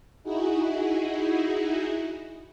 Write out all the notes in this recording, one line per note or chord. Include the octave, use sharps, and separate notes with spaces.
D#4 E4 F#4 G#4